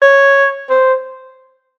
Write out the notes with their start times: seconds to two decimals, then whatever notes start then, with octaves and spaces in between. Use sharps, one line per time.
0.02 C#5
0.70 C5